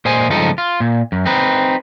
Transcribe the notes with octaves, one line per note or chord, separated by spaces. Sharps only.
A#2 C5 D#5 G#5
C#2 G2 F3 D#4 A4 D#5
F4
A#2
F#2
C4 D#4 B4